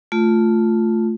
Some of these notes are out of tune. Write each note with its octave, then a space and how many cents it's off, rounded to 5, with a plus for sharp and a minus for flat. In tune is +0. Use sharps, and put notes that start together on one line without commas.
A3 +0 F4 +0